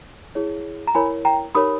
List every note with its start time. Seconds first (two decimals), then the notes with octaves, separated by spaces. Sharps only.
0.35 E4 G#4 C#5
0.87 A#5
0.95 E4 A#4 C#5 G#5 B5
1.25 G5 A#5
1.55 D#4 G4 A#4 C#5 B5 D#6